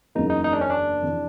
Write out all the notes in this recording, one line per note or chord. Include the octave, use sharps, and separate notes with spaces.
F#1 E2 C#3 F#3 A#3 D#4
D#4
D#4
D4
C#4
D4
F2 C3 E3